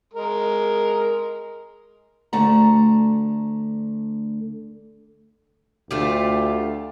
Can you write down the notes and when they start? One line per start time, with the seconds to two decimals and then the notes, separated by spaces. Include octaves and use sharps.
0.13 G#3 A#4
2.33 D2 D3 A3 A5 A#5
5.91 D2 A3 F4 G4